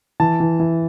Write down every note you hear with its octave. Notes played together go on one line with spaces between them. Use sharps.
E3 A5
E3
E3